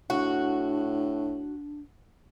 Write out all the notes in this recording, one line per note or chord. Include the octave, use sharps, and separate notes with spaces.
A2 D4 F#4